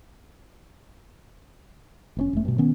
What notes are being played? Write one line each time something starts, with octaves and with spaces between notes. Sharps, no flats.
F1 B2 C#4
E1 A3
G2 B2
D#3 B3 C#4